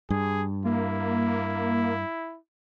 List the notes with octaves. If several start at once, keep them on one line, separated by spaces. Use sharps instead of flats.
G2 G#4
A#3 E4